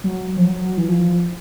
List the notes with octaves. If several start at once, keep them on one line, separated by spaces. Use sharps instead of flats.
F#3
F3
F#3
E3
F3